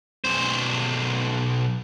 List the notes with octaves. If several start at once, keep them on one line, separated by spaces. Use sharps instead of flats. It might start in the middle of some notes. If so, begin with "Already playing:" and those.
B1 C5